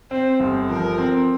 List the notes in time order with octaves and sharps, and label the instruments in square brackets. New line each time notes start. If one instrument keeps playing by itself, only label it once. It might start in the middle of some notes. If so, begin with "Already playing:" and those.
[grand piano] C4 [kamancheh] C5
[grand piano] G1
[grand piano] F3 [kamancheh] A#4
[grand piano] C4